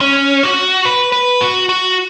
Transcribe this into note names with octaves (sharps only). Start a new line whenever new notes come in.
C#4
F#4
B4
B4
F#4
F#4